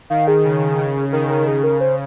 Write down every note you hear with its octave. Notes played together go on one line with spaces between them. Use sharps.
D#3 F5
G#4
C#3
C#3
D#3 A#4
A#4
C#3 G#4
A#4
C5